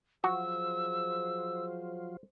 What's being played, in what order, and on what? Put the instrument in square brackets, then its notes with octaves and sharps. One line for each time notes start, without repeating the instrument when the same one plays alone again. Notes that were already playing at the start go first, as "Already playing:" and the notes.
[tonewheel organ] F3 F#3 F4 [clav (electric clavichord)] F#4 [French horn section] G#4 C5 [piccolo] E6